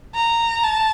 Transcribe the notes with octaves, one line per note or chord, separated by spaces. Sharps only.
A#5
A5